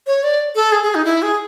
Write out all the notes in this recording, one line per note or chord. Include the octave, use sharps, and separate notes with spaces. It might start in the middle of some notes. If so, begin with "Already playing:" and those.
C#5
D5
A4
G#4
G#4
D#4
E4
G#4